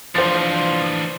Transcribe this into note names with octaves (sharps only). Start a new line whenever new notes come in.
E3 F3 D4 C5 A6